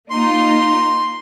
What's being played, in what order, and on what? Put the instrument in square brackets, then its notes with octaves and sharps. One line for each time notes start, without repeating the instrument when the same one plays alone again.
[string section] A#3 D#4 F4 [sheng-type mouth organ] C6